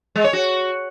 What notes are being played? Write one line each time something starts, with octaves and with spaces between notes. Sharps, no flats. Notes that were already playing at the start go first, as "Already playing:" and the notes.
G#3
C#5
F#4